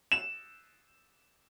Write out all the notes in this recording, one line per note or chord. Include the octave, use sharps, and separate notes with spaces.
E7